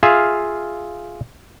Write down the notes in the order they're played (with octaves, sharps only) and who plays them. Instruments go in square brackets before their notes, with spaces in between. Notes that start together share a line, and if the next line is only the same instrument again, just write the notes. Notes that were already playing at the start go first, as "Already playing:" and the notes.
[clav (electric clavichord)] F4 G#4 E5 F5